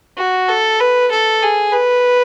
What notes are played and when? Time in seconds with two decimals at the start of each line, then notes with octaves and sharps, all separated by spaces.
0.18 F#4
0.49 A4
0.80 B4
1.12 A4
1.42 G#4
1.73 B4